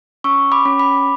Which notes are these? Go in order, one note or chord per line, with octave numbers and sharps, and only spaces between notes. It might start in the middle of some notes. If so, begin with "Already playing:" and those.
C#4 C#6 E6
B5 D6
C#4
B5 D6